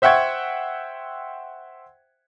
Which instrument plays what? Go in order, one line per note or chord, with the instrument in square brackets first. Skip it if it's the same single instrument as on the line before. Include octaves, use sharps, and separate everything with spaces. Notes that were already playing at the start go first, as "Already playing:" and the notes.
[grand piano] C5 E5 F#5 G5 C#6 G#6